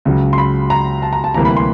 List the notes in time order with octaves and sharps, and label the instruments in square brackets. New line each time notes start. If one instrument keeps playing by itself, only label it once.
[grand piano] C#2 C#3 F#3
C6
B5
A#5
A5
A#5
A5
D2 C3 E3 G3 A#3 A#5
B5
C6